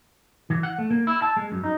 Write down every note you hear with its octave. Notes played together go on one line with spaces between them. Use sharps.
E3
F#5
A3
A#3
E4
A5
G#3
F#2
D#4